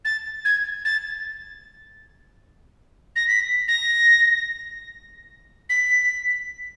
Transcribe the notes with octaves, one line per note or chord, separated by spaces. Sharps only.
A6
G#6
A6
A#6
B6
A#6
B6